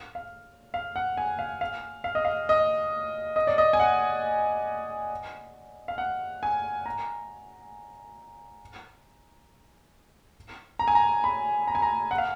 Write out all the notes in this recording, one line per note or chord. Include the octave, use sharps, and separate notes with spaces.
F5
F5
F#5
G#5
F5
F5
F5
D#5
F5
D#5
D#5
D5
D#5
G#5
F#5
F5
F#5
G#5
A#5
A#5
G#5
A#5
B5
A#5
G#5
A#5
F#5
F5